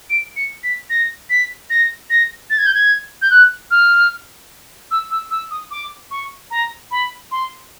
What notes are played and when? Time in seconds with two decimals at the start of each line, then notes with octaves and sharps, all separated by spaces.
0.10 D7
0.36 C#7
0.63 B6
0.90 A#6
1.30 B6
1.70 A#6
2.10 A#6
2.50 A6
2.58 G#6
2.66 G6
2.74 G#6
3.22 G6
3.30 F#6
3.71 F6
4.91 E6
5.11 E6
5.31 E6
5.51 D#6
5.71 D6
6.11 C#6
6.51 A#5
6.91 B5
7.31 C6